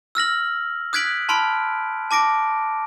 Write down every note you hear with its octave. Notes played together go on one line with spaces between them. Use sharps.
E6 F6 A#6 F#7
D#6 F#6 G#6 B6 D7 F#7
A5 B5 C6 F6 D7
A5 D6 A#6 D7